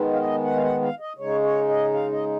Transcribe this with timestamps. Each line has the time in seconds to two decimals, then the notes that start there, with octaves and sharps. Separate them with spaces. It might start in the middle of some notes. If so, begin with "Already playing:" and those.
Already playing: D#3 G#3 B3
0.14 F5
0.18 D#5
0.44 F#5
0.57 F5
0.63 F#5
0.82 F5
1.00 D#5
1.18 C#3 G#3 D#4 C#5
1.43 C#5
1.69 D#5
1.94 F5
2.12 D#5